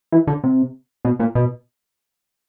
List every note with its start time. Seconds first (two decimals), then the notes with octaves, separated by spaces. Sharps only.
0.12 E3
0.27 D3
0.44 C3
1.05 B2
1.20 A#2
1.35 B2